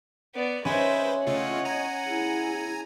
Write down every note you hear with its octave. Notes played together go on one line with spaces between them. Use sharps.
B3 D5
G#3 C#4 B4 C5 E5
C#3 A3 F4 C#5 D#5 F#5
G#5 A#5
E4 G#4